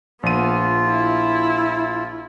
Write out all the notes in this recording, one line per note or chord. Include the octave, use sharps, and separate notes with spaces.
A#1 B3 F4 D#7
E4